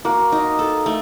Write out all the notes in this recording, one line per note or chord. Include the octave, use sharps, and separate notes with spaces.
A#3 F#4
D#4
A4
A3